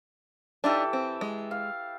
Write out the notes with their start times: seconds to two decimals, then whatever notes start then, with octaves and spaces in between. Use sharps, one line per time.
0.64 E3 D4 D#4 G4 A4
0.93 C4
1.21 G#3
1.51 F5